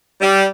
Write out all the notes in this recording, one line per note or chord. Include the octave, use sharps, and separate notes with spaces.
G3